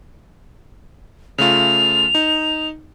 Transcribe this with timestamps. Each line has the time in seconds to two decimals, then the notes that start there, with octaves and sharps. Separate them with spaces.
1.38 C#3 A3 F4 F7
2.15 D#4